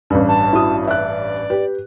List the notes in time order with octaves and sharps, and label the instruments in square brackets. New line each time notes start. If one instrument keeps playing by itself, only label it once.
[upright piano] A1 G2
[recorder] A5
[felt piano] E4 F#4 D#6
[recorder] D5 [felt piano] E5 F#6
[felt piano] G4 [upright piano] B4